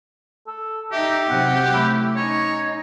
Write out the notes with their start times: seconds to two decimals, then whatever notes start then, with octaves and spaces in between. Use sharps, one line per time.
0.47 A4
0.92 D#4 G4 E5
1.30 C3 F#3 F#5
1.74 A3 E4
2.16 C#4 D#4 C#5